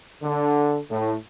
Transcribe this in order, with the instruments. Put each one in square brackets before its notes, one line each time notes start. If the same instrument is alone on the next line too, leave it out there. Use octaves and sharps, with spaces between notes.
[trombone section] D3
A2